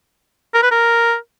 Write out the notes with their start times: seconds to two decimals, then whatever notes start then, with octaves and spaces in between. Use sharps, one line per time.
0.54 A#4
0.63 B4
0.71 A#4